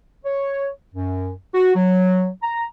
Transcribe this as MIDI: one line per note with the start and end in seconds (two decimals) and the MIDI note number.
0.25 0.69 73
0.94 1.32 42
1.54 1.73 66
1.76 2.29 54
2.43 2.65 82